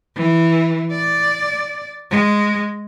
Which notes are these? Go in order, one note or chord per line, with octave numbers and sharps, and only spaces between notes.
E3
D5
G#3